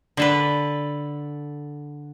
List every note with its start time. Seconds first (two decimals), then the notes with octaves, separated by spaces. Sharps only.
0.17 D3 A4 B4